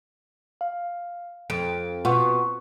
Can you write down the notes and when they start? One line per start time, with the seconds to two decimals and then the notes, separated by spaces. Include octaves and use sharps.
0.61 F5
1.50 F2 D7
2.05 B2 F4 F#5 C#6